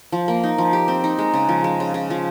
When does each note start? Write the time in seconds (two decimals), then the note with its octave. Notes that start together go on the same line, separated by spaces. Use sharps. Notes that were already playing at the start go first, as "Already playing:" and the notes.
0.12 F3
0.28 A#3
0.43 D#4
0.58 F3
0.73 G4
0.88 C4
1.04 D#4
1.19 G#3
1.34 C#3
1.49 F3
1.64 G#3
1.80 C#3
1.94 C#3
2.10 F3